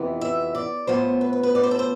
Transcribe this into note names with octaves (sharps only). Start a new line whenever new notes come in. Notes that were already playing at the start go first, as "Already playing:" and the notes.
Already playing: F2 C3 E3 B3
E5
D5
A2 F3 B3 C5
B4
B4
B4
D5
C5
A4
C5